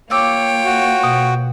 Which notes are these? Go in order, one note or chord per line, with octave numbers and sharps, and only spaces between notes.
A#3 F4 C#5 G5 D6 E6
F#4
B2